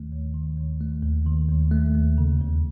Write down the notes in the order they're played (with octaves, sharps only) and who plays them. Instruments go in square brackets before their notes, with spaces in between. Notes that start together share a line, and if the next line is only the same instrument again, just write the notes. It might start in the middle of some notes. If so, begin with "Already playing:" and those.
Already playing: [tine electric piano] D#2 D#3 A3
D#2
D#3
D#2
A3
D#2
D#3
D#2
A3
D#2
C#3
E2